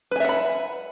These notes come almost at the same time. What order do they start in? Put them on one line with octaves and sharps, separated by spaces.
B4 G#5 E5 F#5 B5